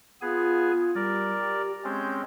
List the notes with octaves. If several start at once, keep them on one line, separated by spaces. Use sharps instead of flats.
B3 F4 G#4 G#5
G3 A#4 D5
G4
G#3 C4 C#4 G6